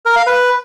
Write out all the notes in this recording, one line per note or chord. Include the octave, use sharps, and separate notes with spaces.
A#4
F5
B4